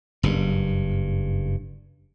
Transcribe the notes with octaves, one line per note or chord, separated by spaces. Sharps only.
F#1 G2